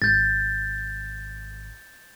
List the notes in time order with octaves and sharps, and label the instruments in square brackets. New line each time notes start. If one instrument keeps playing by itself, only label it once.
[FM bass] G#1 [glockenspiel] G6 A6